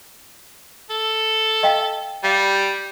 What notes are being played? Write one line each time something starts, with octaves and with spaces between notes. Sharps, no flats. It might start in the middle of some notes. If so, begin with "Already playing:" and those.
A4
D#5 F5 G5
G3 F5